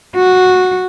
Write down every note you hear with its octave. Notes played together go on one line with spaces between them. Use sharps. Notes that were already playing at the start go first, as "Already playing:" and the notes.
F#4